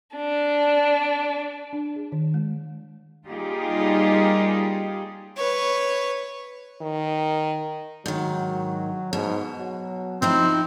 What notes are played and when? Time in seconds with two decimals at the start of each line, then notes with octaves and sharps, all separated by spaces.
0.16 D4
1.73 D4
1.96 G#4
2.12 D#3
2.34 G#3
3.28 G3 A#3 D#4 F4 G4 G#4
5.37 B4 C#5
6.81 D#3
8.06 G#2 D#3 F#3
9.13 G#2 B2
9.59 F#3
10.22 F3 C4 D#4 E4